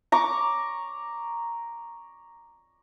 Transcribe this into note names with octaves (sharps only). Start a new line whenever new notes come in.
A#5 C#6 D6